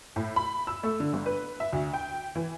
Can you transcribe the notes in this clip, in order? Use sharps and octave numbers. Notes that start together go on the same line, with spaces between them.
A2
B5
E6
A3
D3
G1
B4
E5
D2
G5
E3